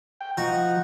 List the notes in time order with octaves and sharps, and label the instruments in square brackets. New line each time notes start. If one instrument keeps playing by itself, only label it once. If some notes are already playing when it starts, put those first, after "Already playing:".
[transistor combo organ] G5
[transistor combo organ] F3 [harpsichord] D#4 F#4